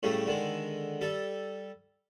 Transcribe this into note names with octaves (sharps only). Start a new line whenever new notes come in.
A2 C#3 G3 A3
D3 D#3 G#3
G3 A4